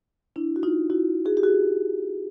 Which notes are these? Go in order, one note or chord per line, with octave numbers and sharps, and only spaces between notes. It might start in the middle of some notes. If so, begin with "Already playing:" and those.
D4 E4
F#4
D#4 F4
E4 F#4
F#4 G#4
G4
F#4 G#4